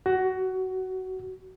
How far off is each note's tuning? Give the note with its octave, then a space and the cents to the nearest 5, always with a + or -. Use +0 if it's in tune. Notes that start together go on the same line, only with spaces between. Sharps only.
F#4 +20